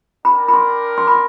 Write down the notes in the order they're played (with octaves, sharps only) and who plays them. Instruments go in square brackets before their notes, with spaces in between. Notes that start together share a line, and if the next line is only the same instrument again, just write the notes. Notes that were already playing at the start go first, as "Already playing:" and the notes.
[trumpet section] D4 G4 A#4 [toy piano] B5
[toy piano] B5
C6
C6
B5
C6